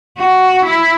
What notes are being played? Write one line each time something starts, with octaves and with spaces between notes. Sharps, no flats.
F#4
E4